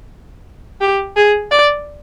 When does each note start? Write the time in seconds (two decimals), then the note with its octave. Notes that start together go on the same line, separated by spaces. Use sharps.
0.81 G4
1.16 G#4
1.51 D5